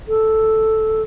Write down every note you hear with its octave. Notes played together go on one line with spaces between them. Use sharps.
A4